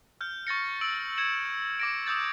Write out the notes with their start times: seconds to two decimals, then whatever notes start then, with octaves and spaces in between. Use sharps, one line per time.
0.21 F6 G6
0.47 C#6 A6 A#6 C#7
0.81 E6 D7 F#7
1.18 G#6 C#7 E7
1.80 D6 A#6 D7
2.07 D#6 E6 G6 A6